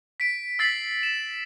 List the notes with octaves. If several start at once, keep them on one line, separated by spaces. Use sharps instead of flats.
B6 D7
E6 A6 B6 C7 F#7
E7